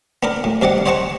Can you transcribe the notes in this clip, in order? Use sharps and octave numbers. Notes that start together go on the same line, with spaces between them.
B3 D4 A#4
A2
G2 C3 D5 D#5 F#5
C5 C#5 D#5 F#5 A5 C#6